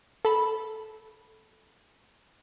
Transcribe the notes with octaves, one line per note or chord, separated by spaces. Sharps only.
A4 B5